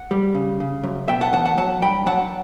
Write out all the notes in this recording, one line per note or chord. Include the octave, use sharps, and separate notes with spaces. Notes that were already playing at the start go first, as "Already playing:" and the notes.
Already playing: F#5
G3
C#3
C#3
F#2
B2 E5 G5
F#5 A5
E2 F#5 A5
F#5 A5
F#3 F#5 A5
G2 G5 B5
F#3 F#5 A5